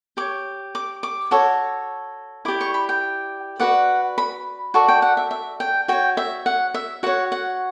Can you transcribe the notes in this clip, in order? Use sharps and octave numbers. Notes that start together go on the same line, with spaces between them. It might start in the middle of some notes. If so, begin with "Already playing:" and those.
G4 C#5 D6
D6
D6
F#4 A4 C#5
E4 G4 D5 D6
C#6
B5
G5
F#4 B4 D5 F#5
B5
F#4 A4 D5 C#6
G5
F#5
E5
E5
G5
F#4 C#5 G5
E5
F#5
E5
F#4 C#5 F#5
F#5